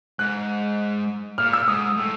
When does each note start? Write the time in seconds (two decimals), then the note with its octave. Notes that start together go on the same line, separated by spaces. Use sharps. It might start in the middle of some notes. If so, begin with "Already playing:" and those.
0.19 G#2 F#6
1.38 A#2 F6
1.53 E6
1.68 G#2 D#6
1.98 A2